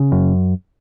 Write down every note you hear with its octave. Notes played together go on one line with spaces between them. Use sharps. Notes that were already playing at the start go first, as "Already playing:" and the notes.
Already playing: C#3
F#2